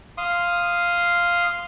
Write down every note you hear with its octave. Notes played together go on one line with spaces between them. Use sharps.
F5 C6 D#6